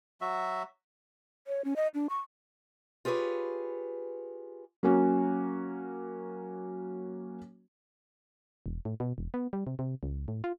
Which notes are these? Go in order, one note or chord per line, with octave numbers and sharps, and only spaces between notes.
F#3 F#4 E5
C#5
C#4
D#5
D4
C#6
F4 G4 G#4 B4 C#5
F#3 A#3 C#4 F#4
E1
A2
B2
E1
B3
G3
C3
C3
C#2
A2
F4